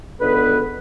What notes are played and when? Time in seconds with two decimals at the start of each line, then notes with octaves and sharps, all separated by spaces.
0.20 C#2 D3 B3 G#4 B4